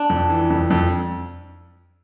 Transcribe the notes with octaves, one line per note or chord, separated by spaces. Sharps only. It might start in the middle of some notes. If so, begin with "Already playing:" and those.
Already playing: D4
F2
E3
F2
F2